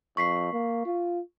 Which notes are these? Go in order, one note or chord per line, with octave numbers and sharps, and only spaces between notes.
F2 C#6 B6 C7
A#3
F4